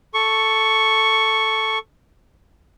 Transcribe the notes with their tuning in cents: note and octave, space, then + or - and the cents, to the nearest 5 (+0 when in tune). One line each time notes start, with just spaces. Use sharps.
A4 +0 C#6 +0